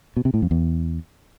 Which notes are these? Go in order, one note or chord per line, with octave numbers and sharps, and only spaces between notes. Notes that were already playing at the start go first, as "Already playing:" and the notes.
B2
C3
A2
F2
E2